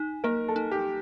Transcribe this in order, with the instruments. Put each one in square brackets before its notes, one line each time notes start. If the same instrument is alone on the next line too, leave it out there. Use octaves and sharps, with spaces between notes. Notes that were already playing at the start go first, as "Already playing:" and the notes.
Already playing: [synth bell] D#4
[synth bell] A#3 [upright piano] A#4
[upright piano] A4
[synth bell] D#4
[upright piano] G4